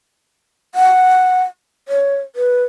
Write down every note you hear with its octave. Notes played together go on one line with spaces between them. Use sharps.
F#5
C#5
B4